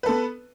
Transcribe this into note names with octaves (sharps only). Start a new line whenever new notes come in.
B3 A4 B4